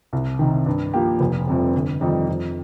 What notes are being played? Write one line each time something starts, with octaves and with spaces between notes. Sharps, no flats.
C2
C3 D#3
G2
F3 A#3 G4
F1
F2 C3 G3
G1
F2 D#3 G3 D#4
F2